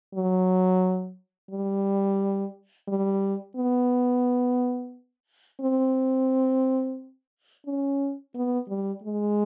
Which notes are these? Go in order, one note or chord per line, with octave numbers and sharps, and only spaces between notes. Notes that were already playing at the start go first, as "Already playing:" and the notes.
F#3
G3
G3
B3
C4
C#4
B3
G3
G#3